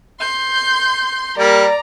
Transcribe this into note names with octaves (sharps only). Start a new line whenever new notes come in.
C6 G6
G3 A#3 D5 A#5